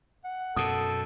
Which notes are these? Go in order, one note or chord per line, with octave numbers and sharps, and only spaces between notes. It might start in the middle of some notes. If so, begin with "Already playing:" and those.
F#5
F#2 B2 A4 D#6